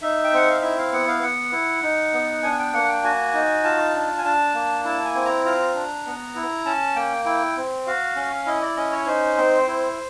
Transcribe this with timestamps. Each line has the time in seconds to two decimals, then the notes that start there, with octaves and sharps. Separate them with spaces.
0.02 D#4 E5
0.24 G5
0.33 C4 F#5
0.50 F5
0.62 E4 E5
0.78 F5
0.93 B3 F#5
1.08 F5
1.22 B3 F#5
1.52 E4
1.83 D#4
2.13 B3
2.43 D4 G#5
2.59 G5
2.73 A#3 F#5
2.88 G5
3.03 F#4 G#5
3.34 D#4
3.64 F4 A5
3.94 D4
4.18 G#5
4.24 D4 A5
4.54 A#3
4.85 E4 A5
5.05 G#5
5.15 C4
5.25 A#5
5.45 F4 A#5
5.74 D4
6.06 B3
6.35 E4
6.65 C#4 A5
6.95 A#3 G5
7.25 E4 G5
7.56 C4
7.87 F#4 F5
8.16 C#4
8.46 E4 D#5
8.62 D5
8.76 C#4 D#5
8.92 C#5
9.06 D#4 C5
9.37 C4
9.68 E4